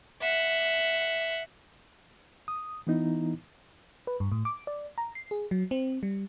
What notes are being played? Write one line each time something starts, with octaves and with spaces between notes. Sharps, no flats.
E5 F#5
D#6
E3 B3 D#4 E4
B4
G2
A2
D6
D5
A#5
C7
G#4
F#3
C4
G3